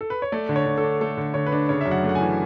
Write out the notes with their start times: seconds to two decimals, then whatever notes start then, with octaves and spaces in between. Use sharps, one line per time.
0.01 A4
0.10 B4
0.22 C#5
0.32 A3 D5
0.49 D3
0.56 C#5
0.66 D3
0.77 A4
0.84 D4
1.01 A3 A4
1.17 D3
1.34 D3 C#5
1.46 B4
1.52 D4
1.69 C#3 C#5
1.81 F#2 E5
1.91 F#5
2.04 A3
2.09 F#5
2.15 G#5
2.21 E3